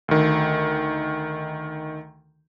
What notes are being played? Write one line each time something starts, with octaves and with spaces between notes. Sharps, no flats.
D2 D#3